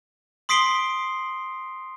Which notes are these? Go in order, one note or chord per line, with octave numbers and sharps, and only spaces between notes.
C6 D#6 B6 C7 D7 G7